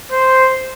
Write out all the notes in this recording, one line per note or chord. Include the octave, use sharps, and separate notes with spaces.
C5